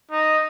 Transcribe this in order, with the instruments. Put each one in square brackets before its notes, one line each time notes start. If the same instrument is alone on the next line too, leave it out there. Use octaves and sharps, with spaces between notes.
[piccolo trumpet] D#4